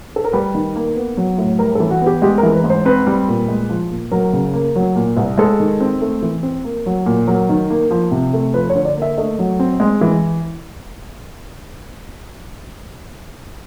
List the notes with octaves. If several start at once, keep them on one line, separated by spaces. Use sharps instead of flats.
A4
A#4
G3 B4
D#3
A#3
B3
F#3
A2
G3 A#4
E3 A4
F#4
B3
G4
G#3 G4
A#4
E3
B4
G#2
C5
C4 B4
G3
A#2
G#3
F3
A#2
F#3 A#4
C#3
A#3
F#3
A#2
C2
G#3 A4
D#3
C4
A3
E3
C4
A#3
F#3
A#2
F#3 A#4
D#3
A#3
F3
C3
A3
F3 B4
C#5
D3
D5
A#3
E5
A3 D#5
F#3
C4
G#3
E3